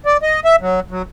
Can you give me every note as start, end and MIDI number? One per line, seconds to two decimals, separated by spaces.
0.06 0.17 74
0.22 0.40 75
0.45 0.56 76
0.61 0.80 54
0.91 1.02 54